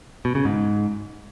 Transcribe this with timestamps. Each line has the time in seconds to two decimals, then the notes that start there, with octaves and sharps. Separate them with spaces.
0.25 B2
0.35 C#3
0.45 G#2